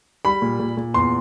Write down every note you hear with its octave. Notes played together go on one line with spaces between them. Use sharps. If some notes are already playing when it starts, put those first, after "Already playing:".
G3 B5
A#2
A#2
A#2
E2 C6